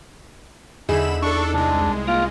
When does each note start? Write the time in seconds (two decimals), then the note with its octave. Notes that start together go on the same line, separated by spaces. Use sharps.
0.89 E2 D3 D#4 E4 G#4 B5 E7
1.22 D4 A4 C#6
1.53 C2 G#3 D4
2.07 A#3 F4